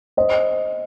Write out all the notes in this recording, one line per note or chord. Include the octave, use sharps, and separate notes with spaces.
C5 D#5